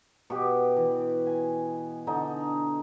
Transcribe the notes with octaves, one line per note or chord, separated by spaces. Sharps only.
B2 G4
E3
G#5
D3 D#4